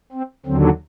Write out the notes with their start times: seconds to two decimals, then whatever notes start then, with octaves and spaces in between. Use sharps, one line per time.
0.12 C4
0.46 D#2 D3 F#3 C4